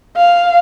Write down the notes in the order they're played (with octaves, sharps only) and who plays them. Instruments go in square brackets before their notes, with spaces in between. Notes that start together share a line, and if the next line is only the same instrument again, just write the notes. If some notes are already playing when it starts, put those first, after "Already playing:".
[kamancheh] F5